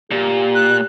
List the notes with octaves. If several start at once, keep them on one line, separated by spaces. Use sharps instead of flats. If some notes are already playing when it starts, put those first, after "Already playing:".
A#2 G4
F#6